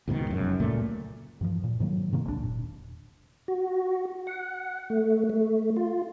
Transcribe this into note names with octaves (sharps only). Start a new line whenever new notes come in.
C#2 G#2 B2 D#3
F1 F#2
G1 C#2 A#2 A3
G2 E3 F3
A#2
G#2 D#3 F#3 A#3
G#2 C3 D#3 A#3
G#1 C#2 C#3 D4
E1 A#2
F#4
F#5
A3
A3
F4